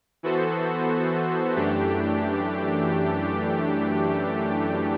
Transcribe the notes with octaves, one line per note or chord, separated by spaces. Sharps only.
E3 B3 F#4 A4 C5
F#2 E3 A3 D4 G4